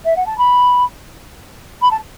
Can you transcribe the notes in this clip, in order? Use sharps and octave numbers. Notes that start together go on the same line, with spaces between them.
E5
F#5
A5
B5
B5
A5